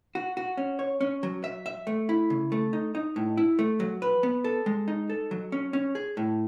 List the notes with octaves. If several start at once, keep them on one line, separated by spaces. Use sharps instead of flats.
F#4
F#4
C#4
C#5
C#4
F#3
E5
E5
A3
E4
C#3
A3
D#4
D#4
A2
E4
A3
F#3
B4
B3
A4
G#3
D#4
A4
F#3
C#4
C#4
G#4
A2